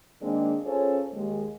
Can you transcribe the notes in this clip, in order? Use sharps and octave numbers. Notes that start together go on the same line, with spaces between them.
D#3 G#3 A#3 C4 D4 G#4
C#4 F4 G#4 A4 C5 C#5
D#2 G#3